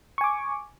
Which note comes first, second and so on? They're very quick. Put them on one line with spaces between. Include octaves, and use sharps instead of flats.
C#6 G#5 D6